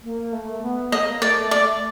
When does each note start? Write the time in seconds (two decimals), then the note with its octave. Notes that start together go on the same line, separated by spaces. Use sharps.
0.03 A#3
0.33 A3
0.62 B3
0.92 A#3 D#5
1.22 A3 D5
1.51 A3 D5